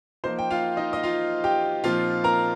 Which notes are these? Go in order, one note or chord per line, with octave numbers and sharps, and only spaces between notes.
F3 A#3 D#4 C5 C6
G5
F4 F5
D#4 D#5
D#5
F4 F5
G4 G5
A#2 F3 C4 D#4 F4 F5
A#4 A#5